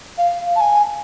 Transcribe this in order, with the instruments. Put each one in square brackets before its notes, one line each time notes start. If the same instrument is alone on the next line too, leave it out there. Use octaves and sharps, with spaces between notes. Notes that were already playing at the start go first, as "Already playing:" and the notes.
[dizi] F5
A5
G#5